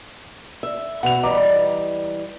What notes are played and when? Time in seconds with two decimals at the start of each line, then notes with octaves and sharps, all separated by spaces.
0.63 E5
1.03 B2 F#5 F7
1.23 E3 G3 D#5 A#5 D6